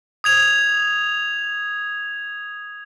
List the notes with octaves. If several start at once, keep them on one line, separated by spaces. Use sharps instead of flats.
D#6 G#6 F7